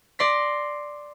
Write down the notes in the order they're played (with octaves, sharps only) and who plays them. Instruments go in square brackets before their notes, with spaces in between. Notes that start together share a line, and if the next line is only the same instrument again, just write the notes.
[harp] D5 C6 A#6 B6